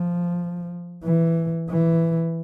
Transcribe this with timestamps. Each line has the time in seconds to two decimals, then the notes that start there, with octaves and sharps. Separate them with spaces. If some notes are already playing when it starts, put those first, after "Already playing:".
Already playing: F3
1.03 E3
1.70 E3